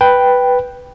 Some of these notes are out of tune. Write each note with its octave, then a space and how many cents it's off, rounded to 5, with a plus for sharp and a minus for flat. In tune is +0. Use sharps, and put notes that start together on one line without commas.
B4 +0 G5 +0